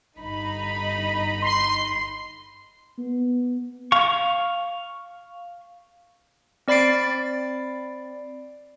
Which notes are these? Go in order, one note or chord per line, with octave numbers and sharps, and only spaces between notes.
G1 D#4 B5
C6
B3
F5 C#6
C4 D5 B5 A6 C7 D7